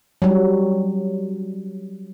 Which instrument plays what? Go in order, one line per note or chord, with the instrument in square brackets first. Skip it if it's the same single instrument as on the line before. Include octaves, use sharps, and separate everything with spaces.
[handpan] F#3 G3